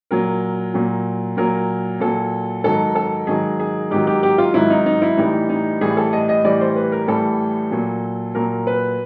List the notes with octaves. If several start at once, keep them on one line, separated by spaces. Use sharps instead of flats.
A#2 F#3 A#4
A#2 F#3
A#2 F#3 A#4
A#2 F#3 A4
G#2 D#3 F#3 A4
A4
G#2 D#3 F#3 G#4
G#4
G#2 D#3 F#3 G4
G4
G4
F4
G#2 D#3 F#3 E4
D#4
D#4
E4
A2 E3 G3 D#4
D#4
A2 E3 G3 G#4
A4
D#5
D#5
A2 E3 G3 D5
C5
B4
A#4
A2 E3 G3 A4
A#2 F#3
A#2 F#3 A#4
B4